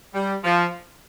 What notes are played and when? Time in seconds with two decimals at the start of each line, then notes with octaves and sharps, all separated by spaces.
0.14 G3
0.44 F3